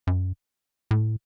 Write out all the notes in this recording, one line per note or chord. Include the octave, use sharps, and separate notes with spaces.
F#2
A2